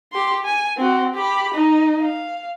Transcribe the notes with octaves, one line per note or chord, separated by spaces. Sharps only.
G4 C6
G#5
C4 F#4
G4 B5
D#4
F5